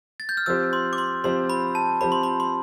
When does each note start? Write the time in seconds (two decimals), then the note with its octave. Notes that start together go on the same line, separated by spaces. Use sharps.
0.20 A6
0.29 G6
0.37 F6
0.46 F3 C4 G4 C5 E6
0.73 C6
0.93 D6
0.98 C6
1.24 F3 C4 G4 C5 C6
1.50 B5
1.75 A5
2.01 F3 C4 G4 C5 B5
2.12 C6
2.23 B5
2.40 C6